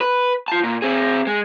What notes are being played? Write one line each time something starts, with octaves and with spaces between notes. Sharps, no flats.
B4
F4 A5
A#2
C4 G#4
G#3